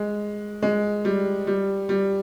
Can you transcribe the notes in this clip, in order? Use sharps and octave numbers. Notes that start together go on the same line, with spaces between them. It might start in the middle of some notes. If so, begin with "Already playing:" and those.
Already playing: G#3
G#3
G3
G3
G3